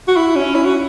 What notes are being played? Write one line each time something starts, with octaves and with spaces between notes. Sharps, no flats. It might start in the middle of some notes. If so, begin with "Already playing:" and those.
F#4
E4
C#4
E4
F#4